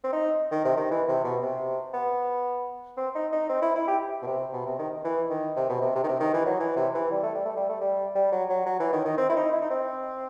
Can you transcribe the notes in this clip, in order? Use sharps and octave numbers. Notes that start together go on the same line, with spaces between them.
C4
D#4
D#3
C3
D#3
E3
C3
B2
C3
B3
C4
D#4
D#4
C4
E4
E4
G4
B2
C3
B2
C3
D#3
E3
D#3
C3
B2
C3
C3
D#3
C3
D#3
E3
F#3
E3
C3
E3
G3
A3
G3
A3
G3
A3
G3
G3
F#3
F#3
F#3
E3
D#3
D#3
C4
E4
D#4
E4
D#4
C4